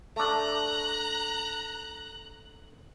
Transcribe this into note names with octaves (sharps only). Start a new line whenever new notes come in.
A3 D4 A#5 F#6